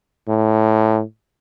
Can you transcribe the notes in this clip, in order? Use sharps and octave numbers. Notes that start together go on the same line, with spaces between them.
A2